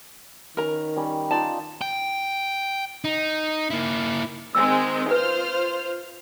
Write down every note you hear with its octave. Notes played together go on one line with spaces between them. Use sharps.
D#3 C#4 A#4 B4 A#5
G3 C#4
D#4 F4 A#4 D5 A5
G5
D#4
A#3 E4
D#3 G#3 C4 E6
F4 B4 C5 F6